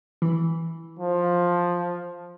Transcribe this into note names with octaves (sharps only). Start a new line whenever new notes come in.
E3
F3